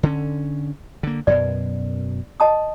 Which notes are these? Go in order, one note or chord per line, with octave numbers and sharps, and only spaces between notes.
D3 C#4
D3 A#3
F#2 B2 D5
D#5 A5 D#6